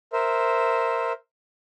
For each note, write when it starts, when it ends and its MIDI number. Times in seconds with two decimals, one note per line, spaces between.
0.13 1.12 70
0.13 1.12 72
0.13 1.12 76